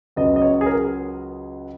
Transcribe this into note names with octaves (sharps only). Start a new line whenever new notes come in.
C#2 C#3 F#3 B3 D#5
D#5
C#5
G#4
A#4